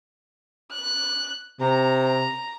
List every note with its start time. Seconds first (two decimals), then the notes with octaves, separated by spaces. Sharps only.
0.71 F#6
1.60 C3 A#5